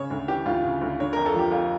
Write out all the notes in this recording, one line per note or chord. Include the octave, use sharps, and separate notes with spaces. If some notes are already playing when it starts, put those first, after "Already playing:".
Already playing: C#3 C#5
D2
E3 G4
D2 F4
C#3
D2
D3 C#5
F2 A#4
A4
F3
G4
F2 F4